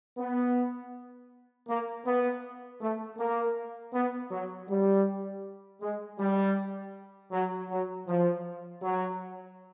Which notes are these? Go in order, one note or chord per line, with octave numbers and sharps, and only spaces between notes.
B3
A#3
B3
A3
A#3
B3
F#3
G3
G#3
G3
F#3
F#3
F3
F#3